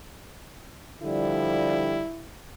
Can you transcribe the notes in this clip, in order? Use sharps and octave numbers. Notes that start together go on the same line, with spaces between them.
D3 F3 G3 E4